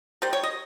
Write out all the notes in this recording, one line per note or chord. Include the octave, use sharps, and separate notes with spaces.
D#3 G3 C5
C#5
D#5